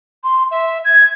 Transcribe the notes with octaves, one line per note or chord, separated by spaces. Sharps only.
C6
E5
G#6